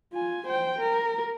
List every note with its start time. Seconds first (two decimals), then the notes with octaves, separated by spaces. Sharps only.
0.13 F4 G#5
0.47 C5 G5
0.79 A#4